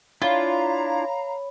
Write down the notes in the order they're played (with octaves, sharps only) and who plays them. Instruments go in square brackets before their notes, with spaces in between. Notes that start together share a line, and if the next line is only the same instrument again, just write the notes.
[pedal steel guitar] D4 E4 [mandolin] F4 [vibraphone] C#5 B5 [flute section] F5 A#5